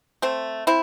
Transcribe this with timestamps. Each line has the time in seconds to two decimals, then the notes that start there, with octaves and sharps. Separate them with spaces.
0.22 A3 C4
0.67 C4 E4